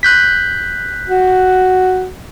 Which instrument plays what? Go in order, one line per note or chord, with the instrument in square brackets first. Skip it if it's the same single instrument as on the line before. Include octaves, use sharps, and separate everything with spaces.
[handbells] F#6 G6 B6
[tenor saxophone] F#4